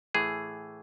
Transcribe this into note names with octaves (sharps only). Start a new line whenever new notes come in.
A2 E3 A3 G#4